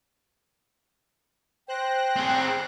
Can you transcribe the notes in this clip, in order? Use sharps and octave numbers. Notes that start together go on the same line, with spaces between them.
C5 G5 F#6 A#6
C4 G#4